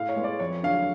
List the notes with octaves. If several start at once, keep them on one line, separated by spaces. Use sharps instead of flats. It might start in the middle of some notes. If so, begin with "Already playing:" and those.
Already playing: A2 F5
C#5
G#3 B3
D5
F2 C#5
D3 F#3 F5